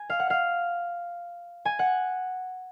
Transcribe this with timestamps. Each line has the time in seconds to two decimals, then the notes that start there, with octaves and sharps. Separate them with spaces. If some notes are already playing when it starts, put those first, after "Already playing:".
Already playing: G#5
0.10 F5
0.20 F#5
0.30 F5
1.65 G#5
1.79 F#5